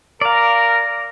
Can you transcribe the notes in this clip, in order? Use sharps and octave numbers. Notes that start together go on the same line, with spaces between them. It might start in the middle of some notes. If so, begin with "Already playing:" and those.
A#4 D5 F5